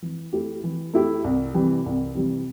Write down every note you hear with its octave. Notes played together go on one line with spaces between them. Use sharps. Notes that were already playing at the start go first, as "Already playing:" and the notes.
E3
A3 E4 G4
E3
A3 E4 G4
C2
C3 E3 G3
C2
C3 E3 G3